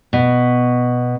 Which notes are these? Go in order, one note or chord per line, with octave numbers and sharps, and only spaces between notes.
B2